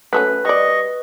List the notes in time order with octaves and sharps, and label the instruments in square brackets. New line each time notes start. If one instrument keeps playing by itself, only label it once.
[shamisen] F#3 A3 C#4 [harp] B4
[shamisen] G3 D5 [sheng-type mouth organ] D#5 C#6